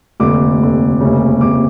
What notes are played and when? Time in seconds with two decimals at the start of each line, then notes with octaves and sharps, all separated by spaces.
0.20 F1 D#2 D3 D6
0.60 F1 D#2 D3
1.01 F1 D#2 C#3
1.41 F1 D#2 C#3 D6